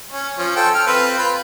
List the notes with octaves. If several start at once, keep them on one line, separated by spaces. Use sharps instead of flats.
C#4
F3 C#4
F4 A4 G5
A4 F6
C4 F4 B4
F4 B5